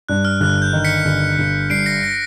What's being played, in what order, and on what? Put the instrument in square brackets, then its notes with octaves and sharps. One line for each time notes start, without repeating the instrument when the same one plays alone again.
[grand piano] G2 [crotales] F#6
[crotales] F6
[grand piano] G1 [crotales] F#6
[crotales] G6
[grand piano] D#3
[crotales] B6 C#7
[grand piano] G1
G1
[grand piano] G2 [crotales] C7 D7
[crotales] A#6
A#6